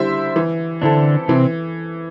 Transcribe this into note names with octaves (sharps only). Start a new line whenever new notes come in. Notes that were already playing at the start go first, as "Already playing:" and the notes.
Already playing: D3 G3 E4 C5 E5
E3
D3 C4 D4 E4 A4
C3 E3 C4